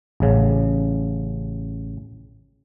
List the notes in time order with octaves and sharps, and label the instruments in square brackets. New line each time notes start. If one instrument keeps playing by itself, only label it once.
[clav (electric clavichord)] A1 C#3